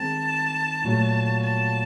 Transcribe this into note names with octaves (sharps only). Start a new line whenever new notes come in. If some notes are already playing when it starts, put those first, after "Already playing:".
Already playing: D#3 G#3 C4 A5
A#2 F#3 A3
A5